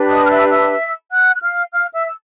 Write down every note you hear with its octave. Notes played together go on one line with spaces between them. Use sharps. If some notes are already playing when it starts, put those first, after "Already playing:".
Already playing: D4 G4 B4
D#5 D#6
F6
E5 E6
E5 E6
F#5 F#6
F#6
F5 F6
F5 F6
E5 E6
E6